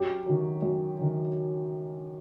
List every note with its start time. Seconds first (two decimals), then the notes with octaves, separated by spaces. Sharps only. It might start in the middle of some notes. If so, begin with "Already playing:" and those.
Already playing: F#2 G4
0.26 D#3 F#3
0.62 F#2
0.99 D#3 F#3